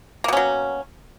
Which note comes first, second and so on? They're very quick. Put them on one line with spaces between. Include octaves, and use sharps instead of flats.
A#3 B2 C#4 F#3